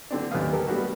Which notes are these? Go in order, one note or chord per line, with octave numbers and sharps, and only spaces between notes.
D3 C4 D4
D#2 A#2 A4 B4 F5 D#6
G4 A4 A#4
G3 A3 B3 D4 F#4